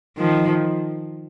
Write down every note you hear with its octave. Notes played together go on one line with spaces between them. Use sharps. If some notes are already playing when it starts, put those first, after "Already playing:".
D#3 F3